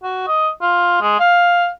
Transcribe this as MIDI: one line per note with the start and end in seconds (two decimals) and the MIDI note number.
0.03 0.26 66
0.27 0.49 75
0.62 0.98 65
1.01 1.18 56
1.20 1.69 77